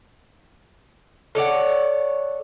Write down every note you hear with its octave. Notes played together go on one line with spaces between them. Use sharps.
A4 C#5 D5 F#5